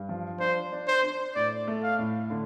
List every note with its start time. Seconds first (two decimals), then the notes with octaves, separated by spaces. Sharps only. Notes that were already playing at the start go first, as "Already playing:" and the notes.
Already playing: G2
0.09 F3
0.40 D4 C5
0.72 D4
0.88 C5
1.03 D4
1.35 A2 D5
1.67 A3
1.83 F5
1.99 A2
2.30 D3